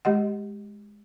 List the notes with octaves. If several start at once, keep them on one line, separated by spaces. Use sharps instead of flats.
G#3 G4 D#5 F#5